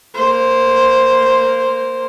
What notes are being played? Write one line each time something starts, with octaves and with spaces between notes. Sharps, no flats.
A#3 C5